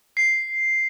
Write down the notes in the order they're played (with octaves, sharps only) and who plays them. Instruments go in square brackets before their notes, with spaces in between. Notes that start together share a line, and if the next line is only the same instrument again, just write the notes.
[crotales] C7